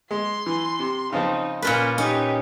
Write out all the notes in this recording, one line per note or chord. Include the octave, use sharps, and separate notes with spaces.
G#3 C6
E3
C3
C#3 F3 C4 D#4
A#2 A#3 C#4 F4 B4
C#4 D#4 G4